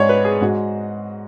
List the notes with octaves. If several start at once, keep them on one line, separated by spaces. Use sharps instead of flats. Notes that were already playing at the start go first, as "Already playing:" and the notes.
Already playing: G#2 G#3 C#5 D5
B4
G#4
G#2 G#3 F#4